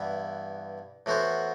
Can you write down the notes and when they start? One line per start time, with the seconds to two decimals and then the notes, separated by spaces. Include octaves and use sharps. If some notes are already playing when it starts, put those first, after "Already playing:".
Already playing: G2 E3 B3 E4
1.06 A2 E3 B3 F#4 C5